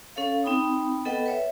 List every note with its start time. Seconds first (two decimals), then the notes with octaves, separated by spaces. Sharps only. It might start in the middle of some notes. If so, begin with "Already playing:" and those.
0.16 C#4 A4 C#5 F5
0.44 C4 D#4 G5 B5 D#6
1.05 B3 A4 B4 D#5 F#5 G5
1.26 B4 C#5 E5